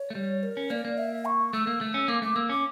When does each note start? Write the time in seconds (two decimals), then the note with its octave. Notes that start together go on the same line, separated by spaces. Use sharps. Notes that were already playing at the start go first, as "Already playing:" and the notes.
Already playing: C#5
0.10 A3
0.15 G3
0.43 A#4
0.57 C#4
0.70 A#3 D5
0.85 A#3
0.98 E5
1.25 C#6
1.53 A3 E6
1.67 A#3
1.81 A3
1.94 C#4
2.08 A#3 D6
2.22 A3 D6
2.36 A#3 E6
2.49 C#4 D6